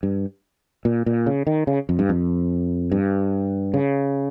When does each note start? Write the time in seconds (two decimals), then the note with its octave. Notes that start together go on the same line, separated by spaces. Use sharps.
0.03 G2
0.85 A#2
1.06 A#2
1.26 C#3
1.47 D#3
1.67 C#3
1.89 F2
1.99 G2
2.09 F2
2.92 G2
3.74 C#3